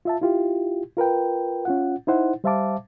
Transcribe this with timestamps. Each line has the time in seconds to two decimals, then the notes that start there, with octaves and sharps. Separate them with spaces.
0.05 F4 E5 A5
0.22 E4 F4 G4
0.97 F4 A#4 B4 G5
1.65 C#4 F4 F#5
2.07 D#4 E4 C5 F#5
2.44 G3 C5 E5 F5 A5 D6